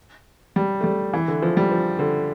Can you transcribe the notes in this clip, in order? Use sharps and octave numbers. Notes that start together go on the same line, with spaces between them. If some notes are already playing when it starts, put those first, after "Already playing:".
G3
A3
G3
E3
D3
F3
G3
F3
D3